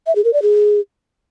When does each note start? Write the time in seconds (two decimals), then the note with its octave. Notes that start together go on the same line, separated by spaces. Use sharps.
0.07 E5
0.15 G#4
0.24 A#4
0.33 D5
0.42 G#4